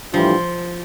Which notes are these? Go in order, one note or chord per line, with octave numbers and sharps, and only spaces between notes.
A2 E3 F3 G3 D4 F4